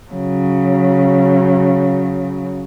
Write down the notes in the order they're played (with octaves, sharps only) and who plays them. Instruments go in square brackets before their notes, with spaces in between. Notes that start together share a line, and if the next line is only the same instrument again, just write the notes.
[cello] C#3 F#3